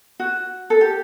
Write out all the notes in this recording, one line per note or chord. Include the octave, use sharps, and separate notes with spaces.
F#4
A4
G4